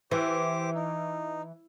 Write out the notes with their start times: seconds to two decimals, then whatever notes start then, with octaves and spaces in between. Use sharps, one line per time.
0.11 E3 G4 C5 D6
0.75 D#4